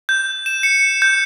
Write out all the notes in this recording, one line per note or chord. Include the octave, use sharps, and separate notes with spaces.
G6
E7
C#7
G6